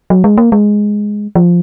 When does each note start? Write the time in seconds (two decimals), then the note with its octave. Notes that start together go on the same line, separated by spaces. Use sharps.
0.10 F#3
0.24 G#3
0.38 A#3
0.52 G#3
1.35 F3